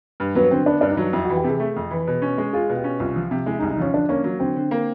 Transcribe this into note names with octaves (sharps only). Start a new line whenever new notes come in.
G2
F#3 B3
D3 C4
B3 D4
G2 D4
D#4
F#3
F2 E4
F#4
E3
G4
C3 G#4
A3
F2
E3
B2
C#4
G#3
F4 G#4
B2
G4
C#4
C2 F4
F3
C3
G#3 E4
D#4
C2
D#4
F3 C#4
D3 D4
A#3 C#4
F#3
D3 C4
D3
A#3